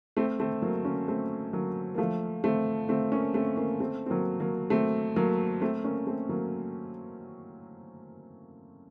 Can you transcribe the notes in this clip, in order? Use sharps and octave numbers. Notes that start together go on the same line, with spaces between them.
A3 C4
A3 C4
F#3 A#3
A#3 C#4
A3 C4
F#3 A#3
A#3
F3 A3
A3 C4
A3 C4
A#3 C#4
A3 C4
A#3 C#4
A3 C4
C4
F#3 A#3
F#3 A#3
A3 C4
F#3 A#3
A3 C4
A#3 C#4
A3 C4
F#3 A#3